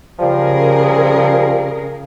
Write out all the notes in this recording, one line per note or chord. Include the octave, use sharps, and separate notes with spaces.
C#3 F3 G3 G#4 A#4